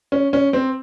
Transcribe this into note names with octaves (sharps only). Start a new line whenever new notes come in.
C#4
C#4
C4